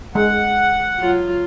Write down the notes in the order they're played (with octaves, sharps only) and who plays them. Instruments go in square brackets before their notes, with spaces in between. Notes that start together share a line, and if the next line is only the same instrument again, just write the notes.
[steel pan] G#3 [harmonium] F#5
[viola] F#3 F4